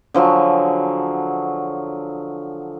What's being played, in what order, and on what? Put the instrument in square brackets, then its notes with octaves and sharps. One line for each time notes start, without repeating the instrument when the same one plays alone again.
[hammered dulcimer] D3 F3 F#3 G#4